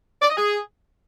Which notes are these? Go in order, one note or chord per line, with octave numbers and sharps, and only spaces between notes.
D5
D#5
G#4